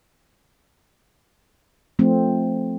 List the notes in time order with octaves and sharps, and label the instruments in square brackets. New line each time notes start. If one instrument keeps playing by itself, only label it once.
[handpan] F3 A3 C4